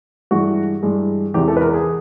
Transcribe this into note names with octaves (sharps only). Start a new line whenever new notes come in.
G2 E3 G#3 F#4
G2 E3 G#3
E2 C3 E3 G#3 G4
A4
B4
A#4
G#4